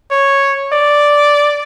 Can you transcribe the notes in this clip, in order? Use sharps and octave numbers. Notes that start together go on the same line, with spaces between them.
C#5
D5